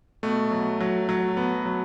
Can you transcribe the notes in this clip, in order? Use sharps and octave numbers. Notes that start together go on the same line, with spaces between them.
B2 A3
F#3
F#3
F#3
B3
F#3